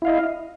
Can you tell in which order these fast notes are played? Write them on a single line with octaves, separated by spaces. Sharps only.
E4 F5 D#5